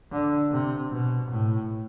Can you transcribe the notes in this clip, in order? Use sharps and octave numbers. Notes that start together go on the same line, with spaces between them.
D3
C3
B2
A2